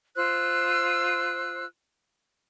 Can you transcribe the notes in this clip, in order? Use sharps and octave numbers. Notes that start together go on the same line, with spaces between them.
F4 C5 E6 F#6